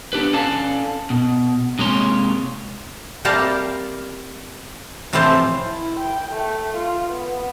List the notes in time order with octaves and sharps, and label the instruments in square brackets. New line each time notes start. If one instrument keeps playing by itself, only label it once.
[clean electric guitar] B3 D4 G4 B4
C#4 A4 D5 F5 A5
B2
C3 G#3 A#3 C#5 C6
[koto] C3 G3 A#3 G4 F5 A5
A2 C3 E3 F3 C5 A5
[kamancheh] E4
G5
A3
F4
B3